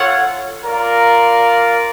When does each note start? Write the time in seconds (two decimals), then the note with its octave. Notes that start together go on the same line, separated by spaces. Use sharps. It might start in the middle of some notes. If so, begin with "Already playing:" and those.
Already playing: F4 A4 C#5 F#5
0.64 F4 A#4 D5 F5